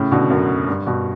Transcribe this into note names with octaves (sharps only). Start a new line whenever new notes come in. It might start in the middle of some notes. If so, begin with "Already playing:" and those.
Already playing: A2 C#3
B2 D3
F#2
G2
G2 B2